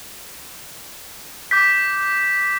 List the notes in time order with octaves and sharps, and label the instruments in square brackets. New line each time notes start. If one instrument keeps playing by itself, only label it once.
[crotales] D6 G6 B6